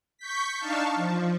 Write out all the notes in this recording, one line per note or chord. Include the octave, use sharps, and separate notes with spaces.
C#6 G6 B6
D4 D#4 F5 A5 C#6
F3